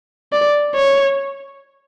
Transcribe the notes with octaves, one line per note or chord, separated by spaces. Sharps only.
D5
C#5